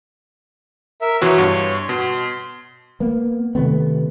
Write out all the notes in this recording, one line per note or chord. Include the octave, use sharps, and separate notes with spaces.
A#4 E5
B2 E3 F#4 C#5 C6
G2
B2 C6
A#3 B3
C3 D#3 A3 B3